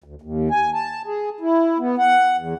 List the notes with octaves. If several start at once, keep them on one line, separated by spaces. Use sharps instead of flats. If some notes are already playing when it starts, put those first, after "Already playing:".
D2
D#2
G#5
A5
G#4
E4
B3
F#5
E2